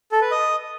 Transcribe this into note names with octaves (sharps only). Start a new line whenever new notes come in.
A4
B4
D#5